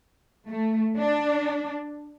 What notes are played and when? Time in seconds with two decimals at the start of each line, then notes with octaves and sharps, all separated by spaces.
0.49 A3
0.96 D4